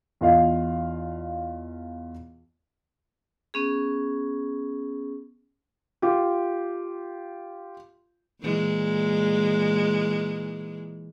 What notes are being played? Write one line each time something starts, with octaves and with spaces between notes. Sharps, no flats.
E2 F4 D#5 F5
B3 C#4 G#4
F4 G4
A#2 E3 G#3